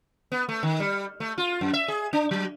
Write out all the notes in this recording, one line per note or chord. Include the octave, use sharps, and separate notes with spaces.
B3
A3
D#3
G3
A3
F4
F#2
E5
G#4
D4
F#3